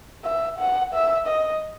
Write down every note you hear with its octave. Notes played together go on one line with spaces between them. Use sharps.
E5
F#5
E5
D#5